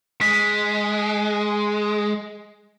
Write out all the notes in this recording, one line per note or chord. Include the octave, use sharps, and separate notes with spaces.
G#3 B6